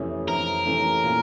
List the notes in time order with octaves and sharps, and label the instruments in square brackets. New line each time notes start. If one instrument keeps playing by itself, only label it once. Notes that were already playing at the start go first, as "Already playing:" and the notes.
Already playing: [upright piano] F2 C3 E3 A3 C#4
[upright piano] F2 [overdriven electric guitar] A#4
[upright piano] C3 E3 A3 C#4
A#2